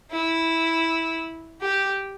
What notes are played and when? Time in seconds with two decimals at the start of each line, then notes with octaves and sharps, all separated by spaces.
0.11 E4
1.62 G4